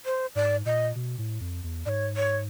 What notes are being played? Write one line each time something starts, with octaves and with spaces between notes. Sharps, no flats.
C5
G#2 D5
A#2 D#5
B2
A2
F2
E2
G#2 C#5 D5
C#5